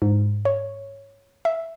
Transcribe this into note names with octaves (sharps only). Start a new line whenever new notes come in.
G#2
C#5
E5